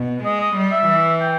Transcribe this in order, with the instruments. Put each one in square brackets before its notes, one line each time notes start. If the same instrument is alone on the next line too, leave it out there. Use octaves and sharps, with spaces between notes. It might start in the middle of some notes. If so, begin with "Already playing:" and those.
Already playing: [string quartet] B2
[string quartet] G#3 [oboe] D#5
[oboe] D#5
[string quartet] G3
[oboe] E5
[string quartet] E3
[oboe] G5